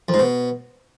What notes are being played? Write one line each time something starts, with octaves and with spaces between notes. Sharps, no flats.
F2
G#2
B2